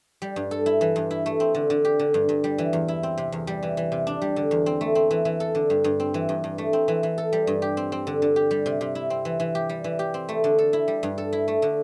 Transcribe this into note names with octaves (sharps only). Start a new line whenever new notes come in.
G3
G2
A4
E4
E3
G2
E4
A3
C4
D3
D3
G4
D3
G2
G2
G3
E3
E2
E4
C4
C3
E2
G3
E3
E3
C3
D4
G3
D3
E2
C4
A3
C4
E3
E3
A4
D3
G2
G2
C4
E3
G2
G2
A3
C4
E3
E3
A4
G3
G2
G4
C4
C4
D3
D3
G4
G3
C3
C3
E4
C4
E3
E3
G4
G3
E3
G4
C4
A3
D3
A4
E4
G3
G2
A4
E4
A3
D3